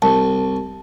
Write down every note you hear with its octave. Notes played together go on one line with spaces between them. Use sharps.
C2 A5